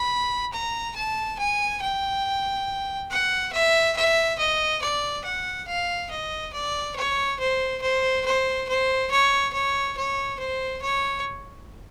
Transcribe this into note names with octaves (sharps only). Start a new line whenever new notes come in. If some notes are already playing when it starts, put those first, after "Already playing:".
Already playing: B5
A#5
A5
G#5
G5
F#5
E5
E5
D#5
D5
F#5
F5
D#5
D5
C#5
C5
C5
C5
C5
C#5
C#5
C#5
C5
C#5